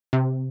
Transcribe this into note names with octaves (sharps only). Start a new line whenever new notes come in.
C3